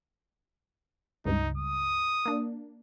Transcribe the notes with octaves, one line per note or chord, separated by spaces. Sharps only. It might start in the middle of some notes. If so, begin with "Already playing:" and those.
C#2 G2 D#4
D#6
A#3 D4